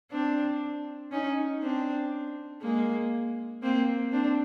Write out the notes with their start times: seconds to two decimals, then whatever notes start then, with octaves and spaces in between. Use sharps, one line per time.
0.11 C4 D4
1.12 C#4 D#4
1.62 C4 D4
2.62 G#3 A#3
3.63 A#3 C4
4.12 C4 D4